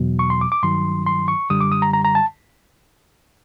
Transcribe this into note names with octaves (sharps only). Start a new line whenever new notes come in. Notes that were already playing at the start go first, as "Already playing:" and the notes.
Already playing: E2 B2 F#3
C#6
C6
D6
D6
G2 D#3 F#3 C6
C6
C#6
F#2 D3 G3 D#6
D6
D#6
A#5
A#5
A#5
A5